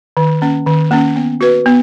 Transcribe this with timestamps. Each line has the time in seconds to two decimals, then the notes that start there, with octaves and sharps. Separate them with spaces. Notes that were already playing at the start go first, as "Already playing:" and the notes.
0.17 D#3
0.42 A#3 C#4
0.66 D#3
0.91 A#3 C#4
1.16 B3
1.41 F#4 B4
1.66 B3